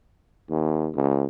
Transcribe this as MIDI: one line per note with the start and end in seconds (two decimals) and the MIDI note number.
0.50 0.90 39
0.95 1.27 37